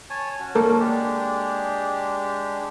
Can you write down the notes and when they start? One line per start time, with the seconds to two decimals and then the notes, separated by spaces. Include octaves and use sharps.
0.10 C#5 G#5 A5
0.40 C#4 F#4
0.55 A#3 A4 A#4
0.80 G#3 D4 G4